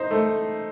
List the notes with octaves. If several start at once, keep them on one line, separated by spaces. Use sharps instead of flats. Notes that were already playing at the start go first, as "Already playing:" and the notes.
Already playing: D#4 C5
A3